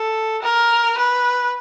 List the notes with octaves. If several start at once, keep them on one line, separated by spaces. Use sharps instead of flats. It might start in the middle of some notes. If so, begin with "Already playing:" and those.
Already playing: A4
A#4
B4